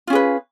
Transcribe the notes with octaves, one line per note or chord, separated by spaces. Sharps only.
C#4 F4 G#4 B4